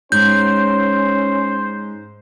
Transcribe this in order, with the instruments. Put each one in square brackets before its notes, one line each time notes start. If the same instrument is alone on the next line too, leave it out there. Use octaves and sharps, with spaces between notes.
[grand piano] G#2 [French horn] C#4 [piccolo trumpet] C5 [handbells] G6